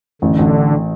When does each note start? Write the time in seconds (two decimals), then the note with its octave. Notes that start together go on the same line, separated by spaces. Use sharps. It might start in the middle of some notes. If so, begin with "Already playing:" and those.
0.22 A1 D3
0.39 A1